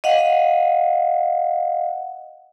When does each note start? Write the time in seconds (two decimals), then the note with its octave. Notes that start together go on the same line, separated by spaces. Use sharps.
0.04 D#5 F5 F#5